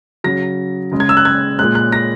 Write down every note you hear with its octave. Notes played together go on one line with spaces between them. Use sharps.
C#3 F#3 A#6
C#3 G#3
G#6
E6
F#6
G#6
A#2 G#3 F#6
F#6
A#6